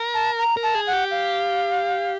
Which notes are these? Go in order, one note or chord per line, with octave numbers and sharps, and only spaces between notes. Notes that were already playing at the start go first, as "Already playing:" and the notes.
Already playing: A#4
A5
A#5
A#4
A5
G#4
F#5
G4
F5